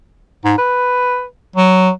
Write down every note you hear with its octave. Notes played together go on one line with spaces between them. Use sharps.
G#2
B4
F#3